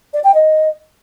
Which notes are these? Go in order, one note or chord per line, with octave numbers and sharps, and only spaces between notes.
D5
G5
D#5